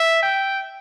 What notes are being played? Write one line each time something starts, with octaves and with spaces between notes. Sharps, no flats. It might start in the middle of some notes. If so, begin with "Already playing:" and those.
Already playing: E5
G5